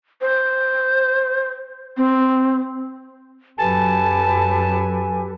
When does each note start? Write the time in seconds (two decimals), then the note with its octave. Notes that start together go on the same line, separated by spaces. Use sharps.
0.21 C5
1.97 C4
3.58 F#2 F#3 G4 A4 B4 G#5 A5